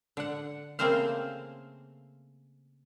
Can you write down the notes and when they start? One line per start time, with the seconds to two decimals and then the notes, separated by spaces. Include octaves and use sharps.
0.17 D3 F#5
0.79 C#3 A3 A#3 C4 C5 F5